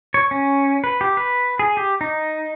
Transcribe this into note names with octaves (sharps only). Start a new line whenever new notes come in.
C#5
C#4
B4
G4
B4
G#4
G4
D#4